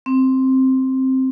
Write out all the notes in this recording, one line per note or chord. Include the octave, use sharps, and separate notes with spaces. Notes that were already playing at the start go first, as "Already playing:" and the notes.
C4